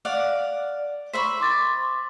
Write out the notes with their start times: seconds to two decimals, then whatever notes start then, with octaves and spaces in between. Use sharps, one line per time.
0.05 D5 F5 F#5
1.13 C5 E5 B5 C#6 B6
1.40 C6 D6 A6